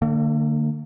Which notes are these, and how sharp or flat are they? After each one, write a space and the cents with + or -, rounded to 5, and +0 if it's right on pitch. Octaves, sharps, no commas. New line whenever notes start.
D3 +25 A#3 -40